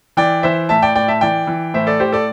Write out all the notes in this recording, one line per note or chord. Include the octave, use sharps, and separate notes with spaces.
E3 D5 G5
E3 C5 E5
A2 E5 A5
D5 G5
A2 D5 G5
E5 A5
E3 D5 G5
E3
A2 C5 E5
A4 D5
A2 G4 C5
A4 D5